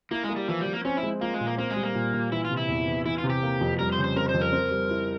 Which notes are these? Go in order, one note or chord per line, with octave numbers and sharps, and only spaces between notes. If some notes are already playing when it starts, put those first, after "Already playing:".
A#3 E4
G#3
A#3
G3
E3 F3
G3
F3
A#3
C4 C#4
E4
G#3
A#3 F4
G#3
A#2
A#3
A#3 C4
G#3
G3
A#3
A#2
A#2
E3 E4
F4
C3
E4
E2
E2
E3 E4
F4
C3
G4
A#3
F2
G3 A#4
C5
C#3
C5
C4 A#4
C5
F2
A#4
C4
G3
E4